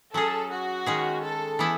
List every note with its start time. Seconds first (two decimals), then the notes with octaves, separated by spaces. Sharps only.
0.14 F#3 C#4 G#4 A4
0.51 F#4
0.86 D#3 G#3 C#4 G#4
1.23 A4
1.59 E3 B3 E4